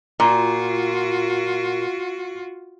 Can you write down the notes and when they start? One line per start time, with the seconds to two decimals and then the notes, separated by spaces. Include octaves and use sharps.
0.20 A#2 F4 F#4